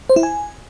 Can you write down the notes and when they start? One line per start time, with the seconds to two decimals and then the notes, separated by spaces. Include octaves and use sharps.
0.09 C5
0.16 E4
0.23 G#5